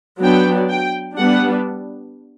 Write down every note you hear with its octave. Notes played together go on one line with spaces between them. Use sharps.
F#3 B3 D4 G5
G5
G3 B3 D4 F#5